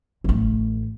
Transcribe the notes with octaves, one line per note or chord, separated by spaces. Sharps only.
A1 A3